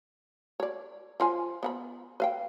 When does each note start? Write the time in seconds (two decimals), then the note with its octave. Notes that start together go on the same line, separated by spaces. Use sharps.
0.60 C#5 D5
1.20 F3 F4 G#5
1.63 B3 F#5 B5
2.20 B4 F5 G5